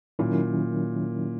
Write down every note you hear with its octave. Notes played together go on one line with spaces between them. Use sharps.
A#2 D#3 F#3 C#4 E4